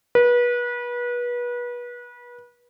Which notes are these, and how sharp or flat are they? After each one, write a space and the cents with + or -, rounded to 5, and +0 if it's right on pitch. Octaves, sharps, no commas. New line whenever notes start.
B4 -30